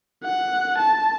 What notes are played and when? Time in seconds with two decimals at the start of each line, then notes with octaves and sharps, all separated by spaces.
0.24 F#5
0.77 A5